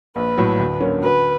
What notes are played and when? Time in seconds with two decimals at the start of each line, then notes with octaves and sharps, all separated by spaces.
0.16 A#1 B4
0.38 A2 F#3
0.59 D2
0.80 D3 F#3 A#3 C#4
1.02 D2 B4